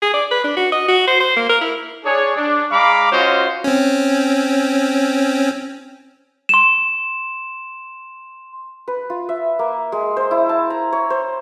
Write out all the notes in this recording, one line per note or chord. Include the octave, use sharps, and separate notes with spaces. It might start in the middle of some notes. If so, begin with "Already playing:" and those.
G#4
D5
B4
D4
F#4
D#5
F#4
C5
C5
A#3
A#4
E4
D4 G#4 C#5
D4
G#3 F5 A#5 B5 D6
C#4 F4 F#4 C5 C#5 D#5
C4 C#4
C6 E7
B4
F4
E5
A#3
G#3
C5
E4
A5
A#5
C#5
C5